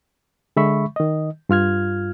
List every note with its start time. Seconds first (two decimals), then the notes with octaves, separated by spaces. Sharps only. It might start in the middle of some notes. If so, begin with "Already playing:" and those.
0.57 D3 G#3 E5 B5 C#6
0.96 D#3 D#5
1.49 G2 F4 F6 G#6